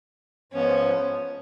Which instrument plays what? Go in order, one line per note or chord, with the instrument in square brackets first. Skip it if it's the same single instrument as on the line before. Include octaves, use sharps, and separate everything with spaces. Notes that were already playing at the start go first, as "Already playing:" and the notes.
[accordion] G#2 F3 B3 [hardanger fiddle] C#4